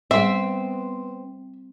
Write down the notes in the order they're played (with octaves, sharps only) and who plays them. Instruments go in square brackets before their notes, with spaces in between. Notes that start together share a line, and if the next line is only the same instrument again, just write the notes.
[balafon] G3 G#4 [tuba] B3 [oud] C4 [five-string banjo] E5